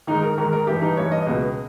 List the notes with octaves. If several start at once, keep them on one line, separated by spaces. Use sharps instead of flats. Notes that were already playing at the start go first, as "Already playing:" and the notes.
G#2 D#3 D#4
A#4
G#2 D#3 A#4
A#4
G2 E3 G4
D#4
G2 E3 C#5
D#5
C#2 B2